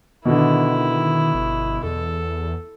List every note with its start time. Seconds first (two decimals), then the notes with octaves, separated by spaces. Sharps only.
0.25 B2 D3 D#3 E4
1.35 G1
1.84 E2 A4